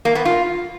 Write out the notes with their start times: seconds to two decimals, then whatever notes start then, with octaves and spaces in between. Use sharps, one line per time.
0.05 A#3
0.15 B3
0.25 F4